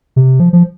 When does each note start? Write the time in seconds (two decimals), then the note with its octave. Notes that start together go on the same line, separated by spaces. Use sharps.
0.16 C3
0.40 F3
0.53 F3